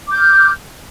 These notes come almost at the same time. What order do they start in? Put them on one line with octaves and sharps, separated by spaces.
D6 G6 F6